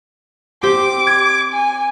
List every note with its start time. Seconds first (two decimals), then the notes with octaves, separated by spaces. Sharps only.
0.63 C4 G4 D6
1.07 G#6
1.53 G#5